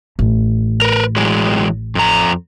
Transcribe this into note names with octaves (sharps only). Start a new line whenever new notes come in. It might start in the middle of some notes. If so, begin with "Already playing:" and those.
A1
A#4 B4
E3 F#3 G#3
F2 A#5